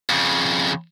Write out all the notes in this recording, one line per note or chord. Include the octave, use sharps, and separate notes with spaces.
F2 C#3